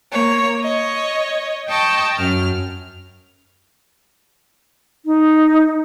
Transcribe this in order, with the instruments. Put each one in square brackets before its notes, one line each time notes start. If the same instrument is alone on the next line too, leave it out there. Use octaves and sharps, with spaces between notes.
[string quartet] A#3 C#5
C#5 D#5
D#5 G5 A5 C#6
F#2 F6
[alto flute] D#4